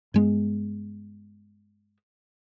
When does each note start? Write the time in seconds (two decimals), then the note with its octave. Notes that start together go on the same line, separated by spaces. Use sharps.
0.14 G2 G#3 B3